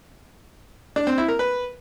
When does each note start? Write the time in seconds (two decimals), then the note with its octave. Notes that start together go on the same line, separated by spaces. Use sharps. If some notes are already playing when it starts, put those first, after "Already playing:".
0.96 D4
1.07 C4
1.18 E4
1.28 A#4
1.39 B4